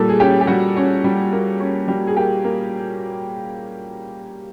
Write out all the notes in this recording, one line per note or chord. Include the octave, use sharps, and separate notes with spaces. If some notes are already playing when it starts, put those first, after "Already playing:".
Already playing: A#2 G3 A4
G#4
C#4 G4
G4
G3 F#4
C#4
G3
A#3
C#4
G3
G#4
A#3 G4
A#3